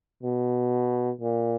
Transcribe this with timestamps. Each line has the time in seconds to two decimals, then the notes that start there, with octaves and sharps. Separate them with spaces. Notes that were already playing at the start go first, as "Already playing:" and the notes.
0.23 B2
1.21 A#2